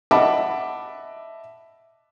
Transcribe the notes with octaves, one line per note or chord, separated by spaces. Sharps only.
D#5 E5 F#5 A5 B5 D6